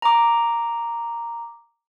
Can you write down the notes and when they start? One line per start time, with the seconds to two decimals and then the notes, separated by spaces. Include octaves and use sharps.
0.02 A#5 D6